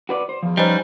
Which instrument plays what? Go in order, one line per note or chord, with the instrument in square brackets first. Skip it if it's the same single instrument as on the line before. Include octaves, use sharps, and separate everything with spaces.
[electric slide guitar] F#4 B4 D5
C5
[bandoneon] E2 [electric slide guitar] F3
[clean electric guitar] G3 [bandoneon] C#4 D#4 B4 [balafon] C5 D#5